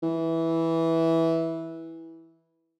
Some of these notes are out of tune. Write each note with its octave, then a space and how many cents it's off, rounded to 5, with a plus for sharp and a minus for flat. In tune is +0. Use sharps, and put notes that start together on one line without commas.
E3 -10